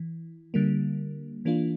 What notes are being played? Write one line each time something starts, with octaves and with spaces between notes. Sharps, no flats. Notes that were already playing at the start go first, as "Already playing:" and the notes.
Already playing: E3
D3 G3 A#3
E3 A#3 D4 F4